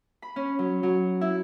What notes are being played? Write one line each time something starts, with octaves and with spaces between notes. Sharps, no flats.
B5
C#4
F#3
F#3
E4